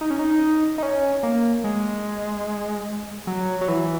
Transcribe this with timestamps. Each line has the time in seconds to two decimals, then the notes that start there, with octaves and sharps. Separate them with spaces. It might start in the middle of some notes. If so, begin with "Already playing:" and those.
0.01 D#4
0.10 C#4
0.19 D#4
0.78 D#4
0.83 C#4
1.23 A#3
1.64 G#3
3.27 F#3
3.61 F#3
3.68 E3